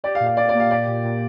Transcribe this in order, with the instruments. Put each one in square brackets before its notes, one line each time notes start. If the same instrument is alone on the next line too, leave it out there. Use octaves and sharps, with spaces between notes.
[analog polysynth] G4 [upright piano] D5
[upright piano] F5
[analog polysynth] A#2
[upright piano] F5
[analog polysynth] A#2 [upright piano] D5
[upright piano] D5
[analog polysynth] A#3
[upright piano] F5
[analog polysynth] G4 [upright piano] D5
[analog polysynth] A#2
A#2